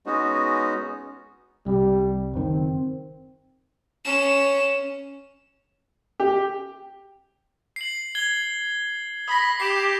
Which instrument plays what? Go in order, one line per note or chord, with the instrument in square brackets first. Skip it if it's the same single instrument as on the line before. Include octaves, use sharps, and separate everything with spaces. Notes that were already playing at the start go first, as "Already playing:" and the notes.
[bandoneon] G#3 B3 C#4 D#4 F#4
[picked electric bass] C2 [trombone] G3
[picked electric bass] F#1 D#3 [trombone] C4
[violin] C#4 E7
[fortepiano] G4
[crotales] C7 F#7
G#6 G7
[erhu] B5 [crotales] D#6 A#6
[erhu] G4 [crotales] C7 E7